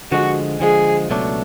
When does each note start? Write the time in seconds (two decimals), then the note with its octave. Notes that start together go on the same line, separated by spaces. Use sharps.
0.12 D3 F3 G#3 F#4
0.60 D3 F3 G#3 G#4
1.09 C#2 B2 F#3 A3 D4